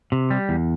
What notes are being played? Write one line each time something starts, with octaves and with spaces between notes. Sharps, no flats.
C3
G3
E2